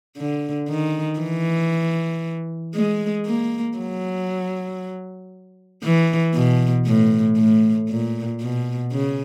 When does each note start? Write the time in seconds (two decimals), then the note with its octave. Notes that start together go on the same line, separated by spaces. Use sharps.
0.17 D3
0.68 D#3
1.20 E3
2.75 G#3
3.26 A#3
3.78 F#3
5.83 E3
6.35 B2
6.87 A2
7.37 A2
7.89 A#2
8.41 B2
8.92 C#3